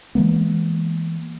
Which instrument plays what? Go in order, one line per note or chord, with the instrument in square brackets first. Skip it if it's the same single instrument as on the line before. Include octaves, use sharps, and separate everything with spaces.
[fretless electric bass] E3 G#3 A#3 B3